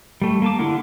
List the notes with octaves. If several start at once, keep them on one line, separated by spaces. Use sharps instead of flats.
G3 A3
A#3 A5 D6
D3 E4 F4 F#5